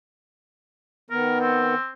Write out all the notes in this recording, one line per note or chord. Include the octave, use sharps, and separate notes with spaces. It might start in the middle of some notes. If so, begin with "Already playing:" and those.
D#3 B3 A#4
C4